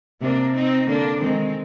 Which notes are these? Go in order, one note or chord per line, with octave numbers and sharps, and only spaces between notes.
C3 A#3 D4
C4 D#4
D3 A#3 D4
D#3 G#3 C4